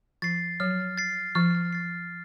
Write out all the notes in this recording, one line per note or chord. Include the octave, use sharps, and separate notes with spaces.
F3 A6 C7
F#3 F6
A6 C7
F3 F6
A6 C7